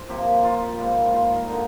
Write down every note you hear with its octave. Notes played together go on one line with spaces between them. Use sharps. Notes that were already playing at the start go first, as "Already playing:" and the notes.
Already playing: C5
C3 F3 A#3 G4
F4
G#2 G3 A#3
F4
A#4
D3 G3 A#3 D#4